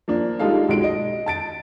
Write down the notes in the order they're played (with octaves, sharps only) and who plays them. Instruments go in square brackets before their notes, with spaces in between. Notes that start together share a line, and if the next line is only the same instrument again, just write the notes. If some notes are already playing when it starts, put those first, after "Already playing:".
[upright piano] F3 A#3 D4
G3 G#3 D#4 F4 A4 F5
B1 G#3 D7
D#5
A5 A6 D7